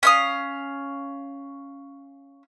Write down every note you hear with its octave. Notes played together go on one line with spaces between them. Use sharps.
C#4 F5 D#6